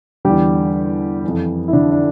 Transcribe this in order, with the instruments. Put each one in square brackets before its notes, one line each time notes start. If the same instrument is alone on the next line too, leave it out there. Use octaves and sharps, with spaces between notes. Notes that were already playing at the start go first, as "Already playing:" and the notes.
[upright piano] E2 D3 G3 G4
E3
F2
E4
D3 D4
D4